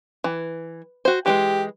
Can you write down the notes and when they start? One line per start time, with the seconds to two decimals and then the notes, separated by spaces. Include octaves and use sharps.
0.24 E3
1.05 F#4 C5
1.26 E3 G3 G#3 G4